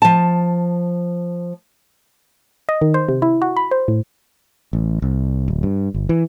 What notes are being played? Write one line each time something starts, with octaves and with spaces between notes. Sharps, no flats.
F3 A5
D#5
D#3
C5
C3
E4
F#4
B5
C5
A2
A1
C2
D1
G2
G1
E3